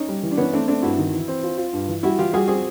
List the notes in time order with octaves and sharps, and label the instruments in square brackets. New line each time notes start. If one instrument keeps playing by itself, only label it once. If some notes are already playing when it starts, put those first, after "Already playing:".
Already playing: [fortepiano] C#4 D#4
[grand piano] G3
E3
[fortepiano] D4
[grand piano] E3 [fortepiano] B3 C#4
[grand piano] A3 [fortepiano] C4 D4
[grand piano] A3 [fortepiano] C4 D4
[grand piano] G2 [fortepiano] E4 F#4
[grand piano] D#3
E3
C4
F4
F4
G2
E3
[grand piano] G3 [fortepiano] E4 F#4
[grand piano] E3 [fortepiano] F4 G4
[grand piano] G3 [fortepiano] F#4 G#4
[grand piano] C4 [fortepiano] F#4 G#4